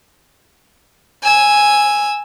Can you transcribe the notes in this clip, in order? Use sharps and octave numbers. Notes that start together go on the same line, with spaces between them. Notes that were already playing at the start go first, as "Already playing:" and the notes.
G#5 E6